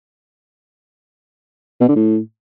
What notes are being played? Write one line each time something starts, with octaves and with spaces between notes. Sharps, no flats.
B2
D3
A2